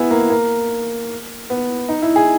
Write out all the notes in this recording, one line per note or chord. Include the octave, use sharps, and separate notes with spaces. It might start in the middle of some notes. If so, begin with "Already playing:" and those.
Already playing: B3 E4 G#4
A#3
A#3
B3
D#4
E4
G#4